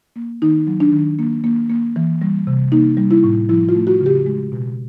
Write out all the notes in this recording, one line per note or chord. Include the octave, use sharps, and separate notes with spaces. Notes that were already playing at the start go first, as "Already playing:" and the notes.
A#3
D#3 D#4
F#3
D4
D#3
A#3
A#3
A#3
E3
G3
C3
A#3 D#4
G3
E4
A2
F3 E4
F4
A3
F#4
C#3
G4
G#3
B2